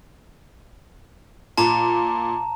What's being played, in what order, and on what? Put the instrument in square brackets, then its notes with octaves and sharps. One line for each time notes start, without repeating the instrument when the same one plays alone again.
[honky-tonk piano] A#2 [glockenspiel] A5 A#5